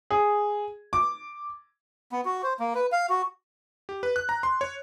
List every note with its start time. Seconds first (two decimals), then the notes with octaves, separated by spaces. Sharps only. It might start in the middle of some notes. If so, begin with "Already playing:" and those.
0.10 G#4
0.93 D6
2.12 B3
2.25 F#4
2.43 C5
2.60 A#3
2.75 B4
2.92 F5
3.10 F#4
3.89 G4
4.03 B4
4.16 F#6
4.29 A#5
4.43 C6
4.61 C#5